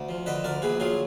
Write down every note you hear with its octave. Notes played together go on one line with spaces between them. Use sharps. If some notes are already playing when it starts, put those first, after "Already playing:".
Already playing: D2
F3
D3 B4 D#5
D2 A#4 D5
A#1 G#4 B4
F#3 F4 G#4